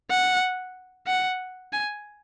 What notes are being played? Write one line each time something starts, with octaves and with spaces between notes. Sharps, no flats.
F#5
F#5
G#5